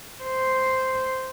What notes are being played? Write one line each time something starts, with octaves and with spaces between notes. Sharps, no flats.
C5